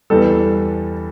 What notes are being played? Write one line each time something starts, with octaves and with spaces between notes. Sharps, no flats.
E2 E3 G3 A4